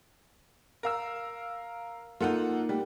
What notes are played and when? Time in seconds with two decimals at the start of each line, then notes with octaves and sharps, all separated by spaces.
0.83 A#4 F5 E6
2.20 A#3 D#4 F4 A4 F#5
2.69 G3